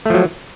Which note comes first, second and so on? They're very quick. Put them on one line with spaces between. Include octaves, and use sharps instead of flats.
A3 F3 F#3